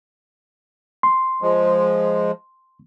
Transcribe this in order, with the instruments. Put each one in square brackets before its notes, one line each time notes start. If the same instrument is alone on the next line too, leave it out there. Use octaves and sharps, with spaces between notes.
[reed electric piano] C6
[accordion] F3 G#3